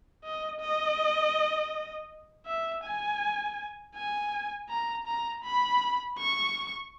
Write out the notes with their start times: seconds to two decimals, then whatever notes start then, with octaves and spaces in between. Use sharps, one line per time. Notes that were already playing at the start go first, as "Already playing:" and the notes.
0.24 D#5
0.60 D#5
2.46 E5
2.84 G#5
3.95 G#5
4.69 A#5
5.07 A#5
5.44 B5
6.18 C#6